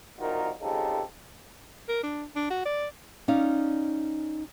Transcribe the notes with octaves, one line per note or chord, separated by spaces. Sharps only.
C2 D#3 D#4 F4 F#4 A#4
F2 C#3 G#3 D#4 G4 A4
A#4
D4
D4
F#4
D5
C#4 D#4 D5 F5